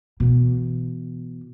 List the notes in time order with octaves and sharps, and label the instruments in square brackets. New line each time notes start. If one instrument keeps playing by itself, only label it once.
[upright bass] B2 E3